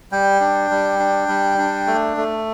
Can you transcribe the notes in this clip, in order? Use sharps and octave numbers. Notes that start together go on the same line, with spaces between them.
G3 G5
D4
G3
D4
G3
D4
A3
A3